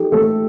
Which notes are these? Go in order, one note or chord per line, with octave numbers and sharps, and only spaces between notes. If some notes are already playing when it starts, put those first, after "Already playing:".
Already playing: F3 D#4 G4 A4
A3 A4